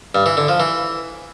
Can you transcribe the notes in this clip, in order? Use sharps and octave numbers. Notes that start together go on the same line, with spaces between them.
G2
E3
D3
F3
E3